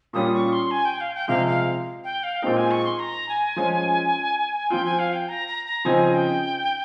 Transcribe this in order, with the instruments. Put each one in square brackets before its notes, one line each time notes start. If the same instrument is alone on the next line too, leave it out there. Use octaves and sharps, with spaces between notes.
[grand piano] A#2 G3 C#4 F4 [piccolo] D#6
[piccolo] C#6
C6
G#5
G5
F5
G5
[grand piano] C3 F3 G#3 [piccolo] F5
[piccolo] F5
G5
F5
[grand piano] A#2 G#3 C4 D#4 [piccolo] G5
[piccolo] G#5
C#6
C6
A#5
G#5
[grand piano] F3 G#3 C#4 F4
[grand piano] F3 C4 F4 [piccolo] G5
[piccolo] G#5
F5
G5
A#5
A#5
A#5
[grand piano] C#3 F3 C4 D#4 [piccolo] G#5
[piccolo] G5